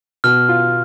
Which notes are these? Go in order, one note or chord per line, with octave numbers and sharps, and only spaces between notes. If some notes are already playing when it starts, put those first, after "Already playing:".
B2 F6
F4